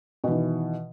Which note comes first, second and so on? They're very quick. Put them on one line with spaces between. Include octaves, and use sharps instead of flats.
B2 E3 D#3